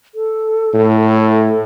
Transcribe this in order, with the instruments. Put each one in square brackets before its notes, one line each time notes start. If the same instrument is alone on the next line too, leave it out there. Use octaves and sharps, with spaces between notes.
[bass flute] A4
[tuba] A2